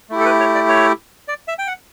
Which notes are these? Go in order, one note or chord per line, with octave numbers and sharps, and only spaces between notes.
A3 E4 G4
A4
B4
C#5
D5
C#5
D5
E5
G5
F#5